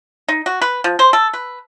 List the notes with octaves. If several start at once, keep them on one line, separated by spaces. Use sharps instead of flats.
D#4
F#4
B4
F3
C5
A4
B4